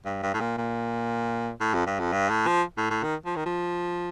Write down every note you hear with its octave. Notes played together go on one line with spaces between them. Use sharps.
G2
G2
A2
A#2
A#2
A2
F2
G2
F2
G2
A2
F3
A2
A2
D#3
F3
D#3
F3